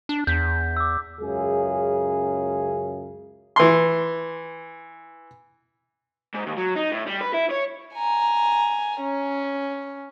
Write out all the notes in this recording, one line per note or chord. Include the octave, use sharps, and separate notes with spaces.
D4
E2 G6 B6
D6 E6
C#2 F#2 C#3 G#4
E3 C6
G#2
D#2
F#3
D#4
A2
G3
B4
E4
C#5
G#5 A#5
C#4